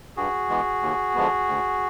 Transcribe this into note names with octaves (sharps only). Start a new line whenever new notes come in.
G2 F#4 G#4
E3 G#3 B3
D#2
D3 F3 G#3 B3
D2